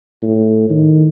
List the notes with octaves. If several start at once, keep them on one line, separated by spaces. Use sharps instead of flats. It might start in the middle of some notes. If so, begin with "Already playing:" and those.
A2
D#3